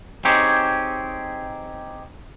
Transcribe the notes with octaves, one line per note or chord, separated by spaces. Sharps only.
C4 D#4 G4 G#4 C#5